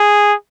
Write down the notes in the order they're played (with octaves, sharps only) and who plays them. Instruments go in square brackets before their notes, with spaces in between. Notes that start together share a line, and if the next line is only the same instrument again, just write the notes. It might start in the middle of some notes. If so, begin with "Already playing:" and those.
Already playing: [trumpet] G#4